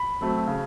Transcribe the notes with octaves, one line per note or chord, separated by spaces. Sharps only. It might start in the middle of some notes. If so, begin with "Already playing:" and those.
Already playing: B5
F#3 A3 C4
C#3